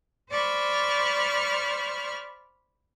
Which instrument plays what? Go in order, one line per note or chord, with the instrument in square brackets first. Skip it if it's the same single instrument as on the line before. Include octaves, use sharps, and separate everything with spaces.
[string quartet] C5 D5 B5 C#6 F6